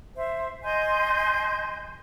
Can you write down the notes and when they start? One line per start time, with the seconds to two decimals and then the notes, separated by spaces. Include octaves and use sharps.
0.16 C5 E5
0.63 D#5 G#5 C6 G6